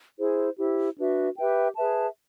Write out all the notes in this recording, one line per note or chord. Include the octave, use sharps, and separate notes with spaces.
E4 G#4 C5
E4 G4 C5
D4 F#4 B4 E5
G4 B4 E5 G5
G#4 B4 E5 A5